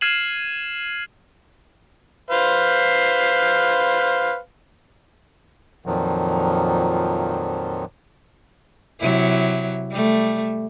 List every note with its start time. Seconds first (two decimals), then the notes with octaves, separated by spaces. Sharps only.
0.01 F6 G#6 C7 D#7 E7 F#7
2.30 B4 C5 F5
5.86 F2 A#2 D#3 F3 F#3
9.00 C3 F#3 E4
9.91 G3 A3